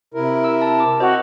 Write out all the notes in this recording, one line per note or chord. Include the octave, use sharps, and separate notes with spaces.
C3 E4 A#4
E6
A5
D6
C4 F#4 C5 D#5